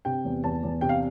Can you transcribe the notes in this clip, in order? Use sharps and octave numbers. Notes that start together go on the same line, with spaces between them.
C3 G5
E2
E2 A5
E2
C3 G5
F5